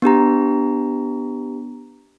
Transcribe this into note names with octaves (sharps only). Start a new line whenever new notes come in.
B3 D4 G4 A#5